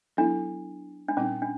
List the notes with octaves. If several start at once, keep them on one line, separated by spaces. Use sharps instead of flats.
F#3 B3 D4 E4 A4
D4
A#2 G3 C4 C#4 D#4
D4